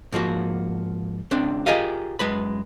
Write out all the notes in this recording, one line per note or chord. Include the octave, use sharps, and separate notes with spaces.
G#2 F3 A#3 F#4
C#2 C4 D4
F4 G4 G#4 A#4 D#5 F5
F#2 G#3 B4 B5